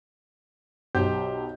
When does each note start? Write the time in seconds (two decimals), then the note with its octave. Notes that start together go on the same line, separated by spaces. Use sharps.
0.95 B1 G4 C5 G6